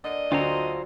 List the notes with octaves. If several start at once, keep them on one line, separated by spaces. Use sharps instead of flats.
D3 A#3 D#5
D2 F#3 F4 C5 A#5